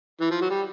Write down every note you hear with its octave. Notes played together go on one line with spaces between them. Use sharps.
E3
F3
F#3
G3